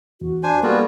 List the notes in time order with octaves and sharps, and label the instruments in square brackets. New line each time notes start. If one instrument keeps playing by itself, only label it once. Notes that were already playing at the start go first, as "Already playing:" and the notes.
[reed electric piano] E2 [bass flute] F#4
[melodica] D4 G#5 [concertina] C5
[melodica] G3 [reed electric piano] A#3 [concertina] B3 F4 F#4 [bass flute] A4